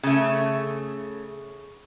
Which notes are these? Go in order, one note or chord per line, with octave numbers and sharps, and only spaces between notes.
C#3 A3